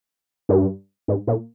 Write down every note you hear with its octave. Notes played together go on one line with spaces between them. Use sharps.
G2
G#2
A#2